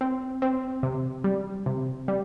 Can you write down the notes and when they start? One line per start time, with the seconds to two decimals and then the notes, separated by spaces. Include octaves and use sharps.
0.01 C4
0.42 C4
0.83 C3
1.24 G3
1.66 C3
2.08 G3